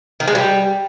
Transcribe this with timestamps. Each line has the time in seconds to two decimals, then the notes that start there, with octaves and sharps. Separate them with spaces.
0.20 D#3
0.28 G#3
0.35 G3